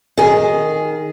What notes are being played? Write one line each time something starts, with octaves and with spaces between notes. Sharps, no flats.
D#3 G#4